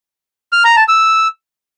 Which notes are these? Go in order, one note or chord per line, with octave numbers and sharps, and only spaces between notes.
F6
A#5
A5
E6